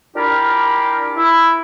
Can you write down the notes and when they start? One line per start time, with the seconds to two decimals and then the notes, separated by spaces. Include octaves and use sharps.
0.16 D4 E4 F4 G4 A#4
1.16 E4